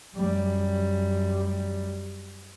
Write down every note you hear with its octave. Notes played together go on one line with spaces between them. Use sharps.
F#2 G3